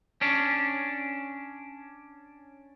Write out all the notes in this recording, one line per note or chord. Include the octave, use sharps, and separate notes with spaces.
C#4 D4